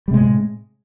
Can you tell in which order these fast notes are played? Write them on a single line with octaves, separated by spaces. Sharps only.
G3 C3 G#3 A2